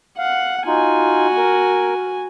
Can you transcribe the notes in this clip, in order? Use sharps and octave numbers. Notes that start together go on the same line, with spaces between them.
F5 F#5
D#4 F4 F#4 G#5
A#4